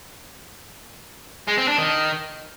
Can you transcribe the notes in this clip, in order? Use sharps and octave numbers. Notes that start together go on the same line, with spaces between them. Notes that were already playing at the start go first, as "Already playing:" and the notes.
G#3
C4
D4
D#3